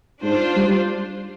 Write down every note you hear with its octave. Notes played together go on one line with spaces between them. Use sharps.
G#2 D4 F4 C5
G3